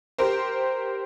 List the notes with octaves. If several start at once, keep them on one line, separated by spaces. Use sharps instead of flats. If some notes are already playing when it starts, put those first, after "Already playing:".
G4 A#4 C5